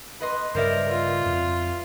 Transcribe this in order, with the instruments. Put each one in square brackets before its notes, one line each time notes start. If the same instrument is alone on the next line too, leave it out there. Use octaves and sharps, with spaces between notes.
[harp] B4 D#5 C6
[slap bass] G2 C#3 [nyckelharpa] A#4 [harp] C5 D5 E5
[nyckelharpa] F4
[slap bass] F2